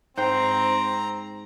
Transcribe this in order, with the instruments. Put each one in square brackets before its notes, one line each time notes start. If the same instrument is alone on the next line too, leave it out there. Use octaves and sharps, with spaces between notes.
[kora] G#2 C5 G5 [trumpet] C4 [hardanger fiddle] A#5